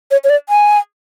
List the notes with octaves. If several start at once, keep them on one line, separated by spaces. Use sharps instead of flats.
C#5
C#5
D5
G#5